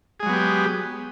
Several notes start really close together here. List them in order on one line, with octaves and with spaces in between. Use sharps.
G#4 G#3 F#3 B3 G4